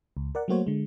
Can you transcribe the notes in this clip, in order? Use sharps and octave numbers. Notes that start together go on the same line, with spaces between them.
C#2
A#4 D5 F#5
F#3 A3 A#3 F#4 C5 C#5
D3 G#3